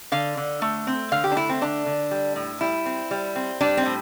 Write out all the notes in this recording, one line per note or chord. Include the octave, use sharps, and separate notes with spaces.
D3 F5
D3
A3
C4
D3 F5
G4
D4
A3 E4
C4
D3 D4
D3
G3
A2
G3 E4
C4
G3
C4
G3 D4
C4
A2